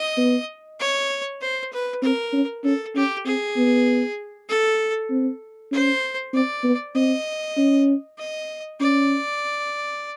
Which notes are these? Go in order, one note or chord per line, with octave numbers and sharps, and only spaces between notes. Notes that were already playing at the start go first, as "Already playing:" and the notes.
Already playing: D#5
B3
C#5
C5
B4
C4 A#4
C#4
C#4 A4
C#4 G4
C4 G#4
B3
A4
C4
C#4 C5
C4 D5
B3
C4 D#5
C#4
D#5
C#4 D5